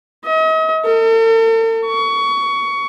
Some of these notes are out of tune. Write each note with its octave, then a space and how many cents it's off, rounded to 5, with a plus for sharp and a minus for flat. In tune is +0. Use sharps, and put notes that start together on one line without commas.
D#5 +40
A4 +45
C#6 +20